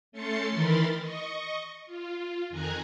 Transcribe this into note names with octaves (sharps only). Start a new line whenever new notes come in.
A3 C#4 C6 A6 C7 C#7
D#3 E3 A#4 B5 C6 A6
D#5 C#6
F4
F2 D#3 G#5 A#5 F#6 G#6